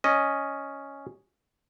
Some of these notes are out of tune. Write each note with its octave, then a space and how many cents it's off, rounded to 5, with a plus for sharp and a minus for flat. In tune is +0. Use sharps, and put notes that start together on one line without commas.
C#4 +0 D#5 +0